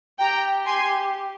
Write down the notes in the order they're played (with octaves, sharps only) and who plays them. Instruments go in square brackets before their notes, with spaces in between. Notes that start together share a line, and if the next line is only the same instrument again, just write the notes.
[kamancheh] G4 [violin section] G5 A#5
[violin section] G#5 C6